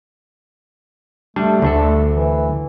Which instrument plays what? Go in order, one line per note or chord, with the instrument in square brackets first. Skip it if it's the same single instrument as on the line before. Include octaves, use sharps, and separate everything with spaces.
[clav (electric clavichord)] G3 D4 [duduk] A3
[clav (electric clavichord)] D2 D4 A4
[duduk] E3